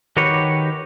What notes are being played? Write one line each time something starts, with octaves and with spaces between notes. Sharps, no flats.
D#3 F#4 G4 A#4 B4 C#5